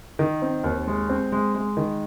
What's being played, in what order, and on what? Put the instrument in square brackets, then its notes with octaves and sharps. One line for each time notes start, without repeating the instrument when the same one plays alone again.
[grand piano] D#3
C4
D#2
G#3
C4
G#3
G#3
D#3